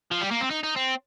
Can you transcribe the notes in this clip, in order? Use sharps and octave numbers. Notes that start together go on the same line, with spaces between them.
F3
G3
A#3
C4
D#4
D#4
C4